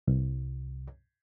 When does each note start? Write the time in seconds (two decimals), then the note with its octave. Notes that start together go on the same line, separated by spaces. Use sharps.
0.08 C2